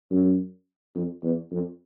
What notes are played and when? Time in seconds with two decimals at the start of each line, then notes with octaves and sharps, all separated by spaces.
0.11 F#2
0.95 F2
1.23 E2
1.51 F2